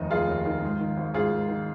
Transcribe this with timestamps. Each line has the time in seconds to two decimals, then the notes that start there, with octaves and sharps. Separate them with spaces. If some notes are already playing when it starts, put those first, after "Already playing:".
Already playing: F1 D#2 D#3 D#4
0.10 F1 F4 G#4
0.27 D#2
0.45 D#3
0.62 G#2
0.79 D#3
0.97 G#1
1.14 G#1 F4 G#4
1.31 G#2
1.49 D#3